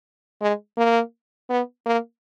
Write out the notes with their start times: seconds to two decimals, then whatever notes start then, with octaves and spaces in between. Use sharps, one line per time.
0.41 G#3
0.77 A#3
1.50 B3
1.86 A#3